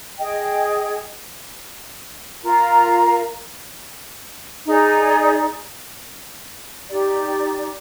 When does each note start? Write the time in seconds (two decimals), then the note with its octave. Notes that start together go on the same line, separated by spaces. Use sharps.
0.18 G#4 D#5 G5
2.42 F4 A#4 F5 A#5
4.66 D#4 G#4 D5
6.90 D#4 G4 D5